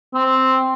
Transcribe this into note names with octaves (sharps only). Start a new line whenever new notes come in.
C4